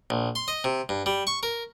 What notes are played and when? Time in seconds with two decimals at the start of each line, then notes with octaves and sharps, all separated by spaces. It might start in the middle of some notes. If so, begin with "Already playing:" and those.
0.10 A#1
0.35 C6
0.48 D#5
0.64 C3
0.89 G2
1.06 G3
1.27 C#6
1.43 A#4